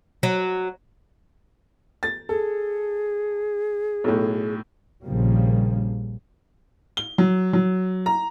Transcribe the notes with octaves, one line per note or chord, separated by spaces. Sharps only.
F#3
A6
G#4 A4
B1 A2
A#1 C#3 F3 G3 A#3
G7
F#3
F#3
A#5